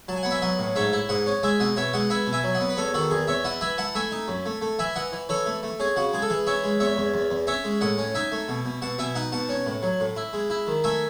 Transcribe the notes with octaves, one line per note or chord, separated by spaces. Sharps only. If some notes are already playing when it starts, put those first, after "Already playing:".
F#3 A5
G#5
B3 F#5
E5 G#5
F#3 D#5 F#5
A2
G#2 C#5 E5
E4
G#2 D#5 F#5
C#4
G#3 E5 G#5
B2 D#5 F#5
B2 C#5 E5
G#3 D#5 F#5
B3 E5 G#5
B2
E5 G#5
F#3
D#5 F#5
B3
B4
E2 A4 C#5
D#3 F#4 A4
E2 G#4
E2 C#5 E5
E4 D#5 F#5
E3 E5 G#5
E3 F#5 A5
A3 E5 G#5
D#4
F#2
A3
A3
E3 E5 G#5
E3 D#5 F#5
E3
E3 A4 C#5
A3
A3
C#4 G#4
C#3 F#4
G#3 G#4
A4
E3 G#4
C#4 C#5 E5
G#3
E2 C#5 E5
E2
E2
E2
C#4 C#5 E5
G#3
A2 D#5 F#5
C#4
D#4 E5 G#5
A3
B2
B2
B2 F#5 A5
B2 E5 G#5
D#4 D#5 F#5
B2 F#5 A5
C#4
A2
F#3
A2
E4
G#3
E4
D#3
A3 E5 G#5